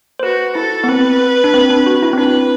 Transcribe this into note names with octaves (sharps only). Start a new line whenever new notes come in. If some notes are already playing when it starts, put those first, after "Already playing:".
C5
F#4 B4
E4 A4
B3
C4 B4
D4
C4
D4
F#4
E4
C4
D4 B4